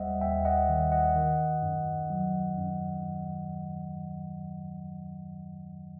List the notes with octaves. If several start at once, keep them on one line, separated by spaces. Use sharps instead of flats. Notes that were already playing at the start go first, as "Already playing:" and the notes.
Already playing: D#2 G3 C5 D#5 E5 F#5
D#2 E5 G5
D#5 F#5
D#3
D#5 F#5
D#3
F#2
F#3
F#2